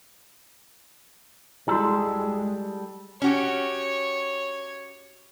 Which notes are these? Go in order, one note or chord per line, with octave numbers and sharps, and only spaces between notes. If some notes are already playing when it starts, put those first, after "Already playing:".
G3 G#3 E4 F#4 A4
C#4 F#4 G4 C#5